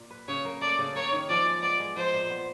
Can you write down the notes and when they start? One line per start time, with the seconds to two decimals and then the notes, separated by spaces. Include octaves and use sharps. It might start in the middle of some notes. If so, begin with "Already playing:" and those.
Already playing: A#2
0.10 B4
0.28 C#3 C#5
0.45 A#3
0.61 A3 D5
0.79 C#3
0.95 A#3 C#5
1.13 D#3
1.29 F3 D5
1.46 G#3
1.62 B3 D5
1.80 G#3
1.96 F3 C5
2.13 A#2
2.30 B3